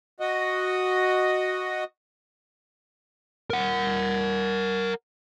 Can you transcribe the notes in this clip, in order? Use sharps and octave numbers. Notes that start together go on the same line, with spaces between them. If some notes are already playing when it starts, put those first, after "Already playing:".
F#4 D#5
A#4 F#5